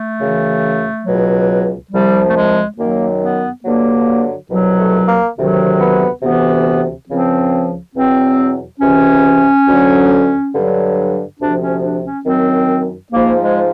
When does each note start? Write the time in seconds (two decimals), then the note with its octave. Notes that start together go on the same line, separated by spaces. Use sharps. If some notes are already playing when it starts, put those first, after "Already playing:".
Already playing: A3
0.19 F#2 C#3 E3
1.05 C#2 B2 F#3
1.91 C2 C3 F3 G3
2.27 A3
2.35 G#3
2.77 F#2 D#3 F#3 A#3
3.21 B3
3.64 G2 D3 F#3 A#3
4.49 C2 B2 F#3
4.79 A3
5.07 A#3
5.37 D2 C3 D#3 F#3
5.80 B3
6.22 D2 C3 E3 B3
7.08 C#2 C#3 F3 C4
7.95 E2 B2 F#3 C4
8.80 C#2 C3 E3 C#4
9.67 D2 D3 F#3
10.53 G2 D3 F#3
11.40 D2 C3 F3 D4
11.60 C#4
11.83 D4
12.04 C#4
12.26 F#2 D#3 F#3 C4
13.12 G#2 F3 A#3
13.41 G#3